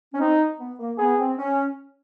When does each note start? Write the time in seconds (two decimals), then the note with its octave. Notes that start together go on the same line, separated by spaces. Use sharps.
0.13 C#4
0.20 C4 D#4
0.59 B3
0.79 A#3
0.98 B3 G#4
1.18 C4
1.38 C#4